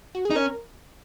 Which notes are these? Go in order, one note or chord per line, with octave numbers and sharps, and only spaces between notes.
F#4
G#4
D#4
C#4 A#4